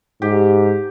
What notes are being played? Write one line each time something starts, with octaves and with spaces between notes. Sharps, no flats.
G#2 G4